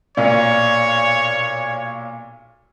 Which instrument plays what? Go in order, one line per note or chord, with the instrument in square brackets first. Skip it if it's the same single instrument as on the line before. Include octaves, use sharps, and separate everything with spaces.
[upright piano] B1 A#2 [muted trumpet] C#5 [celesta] D5